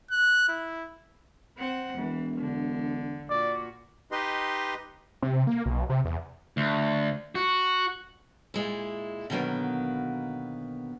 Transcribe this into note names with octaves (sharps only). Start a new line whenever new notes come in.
F#6
E4
C4 F#5
E1 E3
D3
A#2 F#4 D5
D#4 G4 B4 D#5 C6
C3
A#3
B1
C3
E2
D2
F#4
A#2 G#3 E4
B2 D3 D#3 F#3 A#3 B3